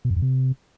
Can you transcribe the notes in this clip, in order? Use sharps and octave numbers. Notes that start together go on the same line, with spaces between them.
B2
F#2
F2
C3